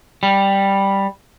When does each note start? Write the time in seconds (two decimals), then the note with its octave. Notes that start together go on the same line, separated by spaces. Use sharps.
0.23 G3